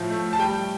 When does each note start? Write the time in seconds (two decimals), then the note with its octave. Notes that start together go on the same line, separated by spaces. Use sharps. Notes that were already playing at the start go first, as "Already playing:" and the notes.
Already playing: A2 F3
0.11 A3
0.33 A5
0.39 G3 G5